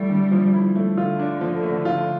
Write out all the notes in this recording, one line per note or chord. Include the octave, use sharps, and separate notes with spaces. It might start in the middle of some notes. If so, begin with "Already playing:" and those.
Already playing: G3 A3 E4
D3
F3
E4
A3
D3 F4
D4
F3
A3
F4